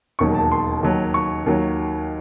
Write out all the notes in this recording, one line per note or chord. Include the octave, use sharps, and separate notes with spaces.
E1 D#2 D#3 F#3 C#6
A5
C6
D#2 D#3 F#3
C#6
D#2 D#3 F#3